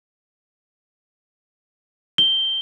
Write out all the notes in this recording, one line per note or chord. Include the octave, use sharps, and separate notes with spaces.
G7